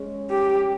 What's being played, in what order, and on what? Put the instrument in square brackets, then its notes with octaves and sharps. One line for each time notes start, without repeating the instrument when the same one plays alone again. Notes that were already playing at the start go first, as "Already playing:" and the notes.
Already playing: [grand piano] G#3 C#4
[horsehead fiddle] G4